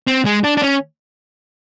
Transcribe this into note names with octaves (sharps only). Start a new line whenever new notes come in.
C4
G#3
D4
D4
C#4